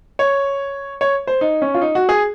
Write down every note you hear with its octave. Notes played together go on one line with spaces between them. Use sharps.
C#5
C#5
C5
D#4
C#4
F4
D#4
F#4
G#4